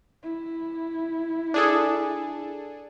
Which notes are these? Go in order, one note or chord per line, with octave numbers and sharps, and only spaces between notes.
E4
D4 G#4 A4